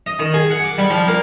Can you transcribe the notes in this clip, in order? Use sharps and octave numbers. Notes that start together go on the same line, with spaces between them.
D#5
D#3
G#4
F#5
D6
G3
F3
A#3